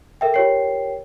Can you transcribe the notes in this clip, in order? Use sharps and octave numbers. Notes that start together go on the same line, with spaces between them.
A4 A#4 E5 G5
F4 G4 A#4 C#5 G5 C7